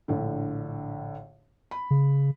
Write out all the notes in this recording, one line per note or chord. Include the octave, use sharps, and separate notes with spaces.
A#1 A2 D3
B5
C#3